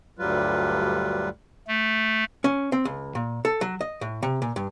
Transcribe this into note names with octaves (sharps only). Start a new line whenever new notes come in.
D2 G2 F#3 G3 F4 B4
A3
C#4
C4
C#2
A#2
A4
F#3
D#5
A2
C3
A#2
G2